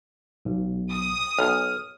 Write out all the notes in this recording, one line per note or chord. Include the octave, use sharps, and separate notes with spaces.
B1
D#6
B1 F6